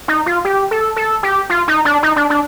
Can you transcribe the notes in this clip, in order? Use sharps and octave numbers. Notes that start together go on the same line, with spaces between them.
D#4
F4
G4
A4
A4
G4
F4
D#4
D4
D#4
D4
D4